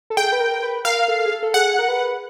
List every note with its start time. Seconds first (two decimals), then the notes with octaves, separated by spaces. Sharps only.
0.10 A4
0.17 G#4 G5
0.32 B4
0.40 A#4
0.63 B4
0.85 A#4 F5
1.08 A4
1.25 G#4
1.31 A4
1.43 A4
1.54 G#4 F#5
1.79 A#4
1.88 B4